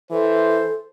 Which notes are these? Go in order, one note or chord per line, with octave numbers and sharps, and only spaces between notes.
E3 A4 C5